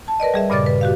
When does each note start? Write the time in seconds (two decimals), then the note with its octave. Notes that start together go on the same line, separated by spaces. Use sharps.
0.08 A5
0.20 A#4 B4 D5 D#5
0.34 G3 G#4 E5
0.50 G2 A#2 C#3 D5 D6 A6
0.66 B4
0.81 F#4 G4 F5